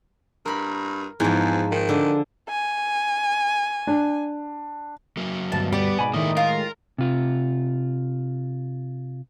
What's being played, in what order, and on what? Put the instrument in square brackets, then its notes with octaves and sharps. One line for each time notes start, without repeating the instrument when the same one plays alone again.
[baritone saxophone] G2 [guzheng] A#4 B5
[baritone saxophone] E2 [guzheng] G#2 F3
[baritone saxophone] D#3
[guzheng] D3
[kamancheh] G#5
[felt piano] D4
[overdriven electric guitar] F#3 A#3
[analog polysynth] D2 G2 B2 [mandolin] A5
[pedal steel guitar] G3 G4 [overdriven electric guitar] B3 [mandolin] D5
[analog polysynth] G#2 B2 [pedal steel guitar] G#5 B5
[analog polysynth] A2 D#3 G#3 [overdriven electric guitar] A#3 E4 [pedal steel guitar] D#6
[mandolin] F4 [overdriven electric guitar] A#4
[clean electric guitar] C3 F4